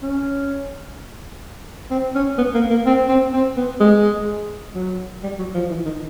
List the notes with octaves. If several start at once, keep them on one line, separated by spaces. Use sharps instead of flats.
C#4
C4
C#4
B3
A#3
A#3
C4
C4
C4
B3
G#3
F#3
G3
F#3
F3
E3
D#3